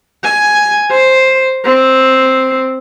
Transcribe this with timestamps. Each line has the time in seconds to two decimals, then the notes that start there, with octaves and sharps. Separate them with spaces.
0.24 G#5
0.91 C5
1.65 C4